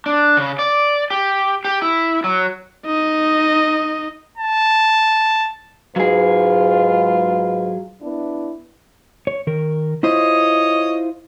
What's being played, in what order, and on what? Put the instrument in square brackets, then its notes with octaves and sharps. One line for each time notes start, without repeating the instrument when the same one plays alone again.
[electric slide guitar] D4
C#3
D5
G4
G4
E4
F#3
[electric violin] D#4 D#5
[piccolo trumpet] A5
[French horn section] G#2 B4 [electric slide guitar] F#3 G#4 [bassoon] F4
[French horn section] B3 D4 E4
[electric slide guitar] C#5
D#3 A#4
[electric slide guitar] E4 F4 C5 [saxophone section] C#5 D#5